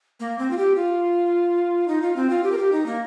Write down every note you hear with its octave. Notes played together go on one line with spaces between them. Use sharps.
A#3
C4
F4
G4
F4
D#4
F4
C4
F4
G4
A#4
G4
D#4
A#3